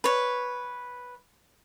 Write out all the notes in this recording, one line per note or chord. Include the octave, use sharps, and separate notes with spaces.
B4 C#5